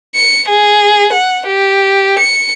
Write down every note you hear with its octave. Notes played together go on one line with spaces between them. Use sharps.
C#7
G#4
F#5
G4
C#7